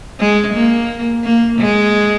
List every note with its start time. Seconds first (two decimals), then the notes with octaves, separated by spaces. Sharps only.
0.19 G#3
0.54 A#3
1.24 A#3
1.59 G#3